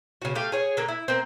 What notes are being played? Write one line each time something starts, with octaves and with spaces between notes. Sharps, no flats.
C#3 F#4
A3 G4 F5
G#4 C#5
D3 A#3
E4
A#3 C4